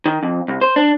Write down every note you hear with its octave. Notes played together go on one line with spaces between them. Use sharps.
D#3
F2
C2
C5
D4